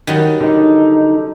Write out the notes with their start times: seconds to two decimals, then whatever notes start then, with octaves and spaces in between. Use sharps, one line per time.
0.07 D#3 F#3 G3
0.41 D3 D#4